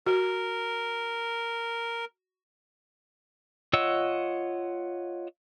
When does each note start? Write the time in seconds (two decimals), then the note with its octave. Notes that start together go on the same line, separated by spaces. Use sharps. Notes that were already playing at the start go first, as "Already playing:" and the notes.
0.06 F#4 A#4
3.73 F4 C#5 D#5 F#5 E6